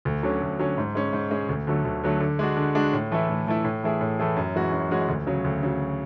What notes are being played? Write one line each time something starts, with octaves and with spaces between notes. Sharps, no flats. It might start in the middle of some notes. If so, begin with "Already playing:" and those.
D2
D3 F#3 C#4
D2
D3 F#3 C#4
G#2
G#3 C#4
G#2
G#3 C#4
D2
D3 F#3 A3
D2
D3 F#3 A3
D3
G#3 D4 F#4
D3
G#3 D4 F#4
A2
E3 A3 E4
A2
E3 A3 E4
A2
E3 A3 E4 G#4
A2
E3 A3 E4 G#4
F#2
E3 G#3 C#4 F#4
F#2
E3 G#3 C#4 F#4
D2
C#3 F#3
D2
C#3 F#3